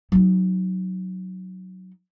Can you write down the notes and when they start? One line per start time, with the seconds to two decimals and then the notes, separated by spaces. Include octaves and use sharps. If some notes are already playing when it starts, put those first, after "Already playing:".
0.12 F#3 D#4